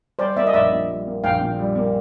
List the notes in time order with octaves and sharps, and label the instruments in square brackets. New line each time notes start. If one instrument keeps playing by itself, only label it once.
[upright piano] G3 [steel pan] C5 D5
[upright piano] A#3 [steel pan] D5 E5
[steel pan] D#5
[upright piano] A#1 [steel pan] D5 E5
[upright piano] A#2
G3
A#3
[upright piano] A#1 [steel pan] F5 G5
[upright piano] A#2
G3
A#3